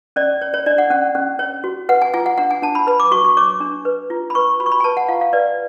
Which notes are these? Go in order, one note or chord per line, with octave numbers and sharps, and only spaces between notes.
C#4 D5
C#5
C#5
D4 D5
F#5
C#4 F#5
C#4
C#5
F#4
B4 F#5
G#5
F4 G#5
F#5
D4 F#5
G#5
D4 A5
B5
B4 B5
D6
F#4 C#6
C#6
C#5 D6
D4
B4
F4
B5
B4 C#6
F#4 B5
C#6
B5
G#5
B4 A5
F#5
F4 F5
F5
B4 D5